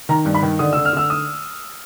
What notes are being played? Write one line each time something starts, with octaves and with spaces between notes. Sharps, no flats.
D#3 A#5
G2
B5
D#3
D3 D#6
E6
D3
F6
D3 E6
D#6